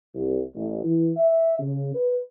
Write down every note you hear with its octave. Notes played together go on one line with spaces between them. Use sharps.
C2
A1
E3
E5
C#3
B4